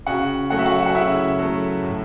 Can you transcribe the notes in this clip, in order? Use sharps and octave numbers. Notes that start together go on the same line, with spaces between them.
C#3 F#4 F#5
F#3 A3 F#5
E5
F#4 F#5
F#5
C#3 E4 E5
F#3 A3
A2